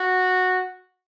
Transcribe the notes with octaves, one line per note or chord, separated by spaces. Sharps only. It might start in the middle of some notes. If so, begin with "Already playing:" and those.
Already playing: F#4